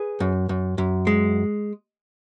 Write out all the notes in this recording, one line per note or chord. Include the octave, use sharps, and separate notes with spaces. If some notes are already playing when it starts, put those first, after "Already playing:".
Already playing: G#4 B4
F#2
F#2
F#2
G#3